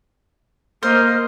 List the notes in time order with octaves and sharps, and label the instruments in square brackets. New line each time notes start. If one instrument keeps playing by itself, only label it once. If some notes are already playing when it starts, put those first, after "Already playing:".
[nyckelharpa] A#3 D#5 [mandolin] C5 [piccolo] F6